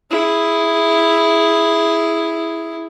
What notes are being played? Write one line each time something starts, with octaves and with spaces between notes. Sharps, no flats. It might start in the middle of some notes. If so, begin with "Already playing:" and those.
E4 G#4